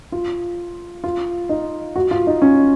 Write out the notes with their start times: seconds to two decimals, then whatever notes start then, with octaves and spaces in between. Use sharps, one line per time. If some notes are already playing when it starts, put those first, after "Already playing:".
0.12 F4
1.04 F4
1.49 D#4
1.96 F#4
2.11 F4
2.27 D#4
2.42 C#4